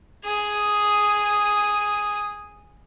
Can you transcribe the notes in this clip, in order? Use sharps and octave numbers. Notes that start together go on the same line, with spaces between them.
G#4 D#6